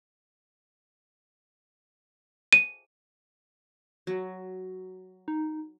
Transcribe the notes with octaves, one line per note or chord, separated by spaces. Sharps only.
D#7
F#3
D#4